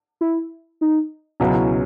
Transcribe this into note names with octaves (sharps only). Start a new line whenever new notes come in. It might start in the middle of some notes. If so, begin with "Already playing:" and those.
E4
D#4
C#2 B2 F#3 C#4 E4